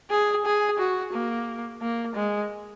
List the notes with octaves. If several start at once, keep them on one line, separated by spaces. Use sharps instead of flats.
G#4
G#4
F#4
A#3
A#3
G#3